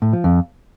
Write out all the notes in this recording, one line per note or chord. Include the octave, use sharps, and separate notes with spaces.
A2
F3
F2